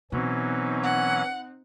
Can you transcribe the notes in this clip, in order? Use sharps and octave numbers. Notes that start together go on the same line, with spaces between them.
B2 E3 F#3 C4 C#4 D#4
F#5